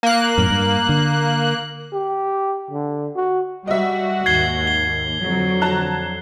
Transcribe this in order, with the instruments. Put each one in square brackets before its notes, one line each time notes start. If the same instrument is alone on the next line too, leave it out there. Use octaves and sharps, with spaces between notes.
[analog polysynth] A#3 F#6
[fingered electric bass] F#2 A2
G2
D3
[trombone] G4
D3
F#4
[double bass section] G3 [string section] F#4 [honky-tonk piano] D#5 E5
[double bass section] D#2 G#2 [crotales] G#6 C7 G7
[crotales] G7
[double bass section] F2 D3 [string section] F#3
[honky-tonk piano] A5 A#5 F#6